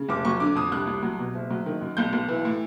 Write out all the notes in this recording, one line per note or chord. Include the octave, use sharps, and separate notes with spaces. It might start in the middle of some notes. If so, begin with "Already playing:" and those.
Already playing: C#3
F1 D6
F#3 C#6
D3 D6
F2 D#6
C2 F#6
C2
F#3
B2
F#1
F#3
D#3
F#2
B1 G6
B1
E3
A2